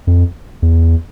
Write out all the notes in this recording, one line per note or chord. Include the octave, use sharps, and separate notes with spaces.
F2
E2